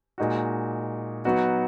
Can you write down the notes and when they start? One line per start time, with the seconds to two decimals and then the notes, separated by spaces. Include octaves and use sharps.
0.18 A#2 G#3 D#4 F#4
1.25 F#3 B3 D#4 F#4